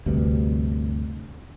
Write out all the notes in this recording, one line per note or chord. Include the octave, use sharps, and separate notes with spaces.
D2 G2 C3